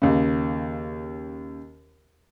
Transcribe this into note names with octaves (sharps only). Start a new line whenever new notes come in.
D#2 C#3